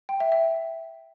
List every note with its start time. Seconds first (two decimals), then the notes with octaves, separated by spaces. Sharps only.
0.09 G5
0.20 E5
0.32 E5